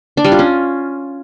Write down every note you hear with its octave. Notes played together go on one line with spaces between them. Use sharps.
D4
G3
F4
C#4